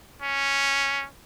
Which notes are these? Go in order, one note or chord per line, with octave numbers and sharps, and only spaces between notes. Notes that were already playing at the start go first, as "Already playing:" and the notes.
C#4